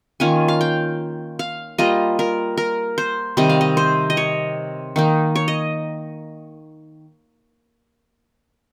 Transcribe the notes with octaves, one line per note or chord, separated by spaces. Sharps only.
D#3 A#3 C#4 F4 G#5
F5
G5
F5
G3 A#3 F4 D#5
A#4
A#4
C5
C3 D#3 G3 D#5
F5
D#5
C5
D#5
C#5
D#3 A#3 D#4
C#5
D#5